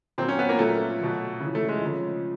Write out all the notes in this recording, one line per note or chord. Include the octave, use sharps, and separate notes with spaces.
A#2 F#3 C4
C#4
B3
A#3
A#2 F#3 A3
B2 F#3
C#3 E3
A3
G#3
C#3 F3